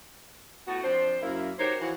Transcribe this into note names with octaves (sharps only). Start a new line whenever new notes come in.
A2 A3 B3 F#4
F3 C4 D4 C5
F#2 A#3 E4
D#4 F#4 G4 A#4 C5 C#5
E3 F3 F#4